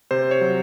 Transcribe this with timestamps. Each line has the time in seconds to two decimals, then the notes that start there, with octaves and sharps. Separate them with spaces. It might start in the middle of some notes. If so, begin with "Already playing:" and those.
0.11 C3 C5
0.31 C#5
0.41 F#3